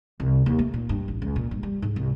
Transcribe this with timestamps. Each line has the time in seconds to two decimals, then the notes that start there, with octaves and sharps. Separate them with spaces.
0.20 C2
0.46 D#2
0.59 A3
0.74 A#2
0.89 G2
1.08 A1
1.22 C#2
1.36 A#2
1.51 G2
1.63 G3
1.82 G#2
1.96 C2